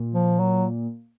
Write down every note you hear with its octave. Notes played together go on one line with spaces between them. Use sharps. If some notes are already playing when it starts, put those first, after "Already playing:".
Already playing: A#2
F3
F#3